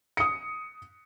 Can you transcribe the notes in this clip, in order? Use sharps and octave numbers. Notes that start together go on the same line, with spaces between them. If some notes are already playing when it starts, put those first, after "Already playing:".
D#6 C#7